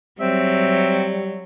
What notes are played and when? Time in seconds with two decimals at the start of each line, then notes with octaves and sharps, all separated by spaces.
0.20 F#3 G3 C4 E5